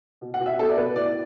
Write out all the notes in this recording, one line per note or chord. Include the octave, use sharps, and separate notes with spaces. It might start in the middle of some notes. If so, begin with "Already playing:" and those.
B2
F#5
B2
E5
B3 A4
D5
B2 B4
A2 D5